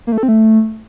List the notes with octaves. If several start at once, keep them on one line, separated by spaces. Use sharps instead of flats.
A#3
A3
A4
C4
A3